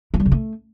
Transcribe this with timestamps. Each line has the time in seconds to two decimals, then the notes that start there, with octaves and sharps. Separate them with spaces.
0.14 E3
0.20 G3
0.26 C#3
0.32 A3